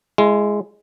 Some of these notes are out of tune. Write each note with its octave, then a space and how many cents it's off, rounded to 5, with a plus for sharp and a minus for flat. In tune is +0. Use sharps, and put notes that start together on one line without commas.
G#3 +0 E4 +30